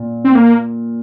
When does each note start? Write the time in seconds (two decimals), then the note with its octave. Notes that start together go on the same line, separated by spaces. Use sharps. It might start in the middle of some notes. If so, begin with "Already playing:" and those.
Already playing: A#2
0.25 C4
0.35 A#3